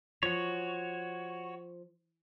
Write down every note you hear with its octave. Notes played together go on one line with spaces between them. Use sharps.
F3 F#4 C#5